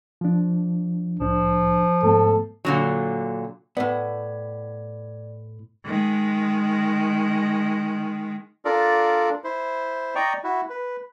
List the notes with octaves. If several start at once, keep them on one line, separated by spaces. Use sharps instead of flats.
F3 D4
C2 A2 F3 D4
G#2 A3 B3 A4
A#2 D3 F#3
A2 B3 D5
D#3 G#3
D4 F4 A4 A#4 D5
E4 C5
D5 D#5 G5 A#5 C#6
E4 F#4
B4